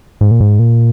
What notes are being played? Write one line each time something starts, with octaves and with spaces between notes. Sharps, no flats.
G#2
A#2
G#2
A#2